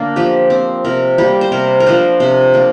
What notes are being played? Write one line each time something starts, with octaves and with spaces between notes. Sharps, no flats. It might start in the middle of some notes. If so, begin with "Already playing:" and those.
Already playing: D3 A#3 D4
F3 G4
C4
C3 A#4
G3 A#3 G4
C5
C3 A#4
A#4
F3 D4 C5
C3 C5
A#3 D4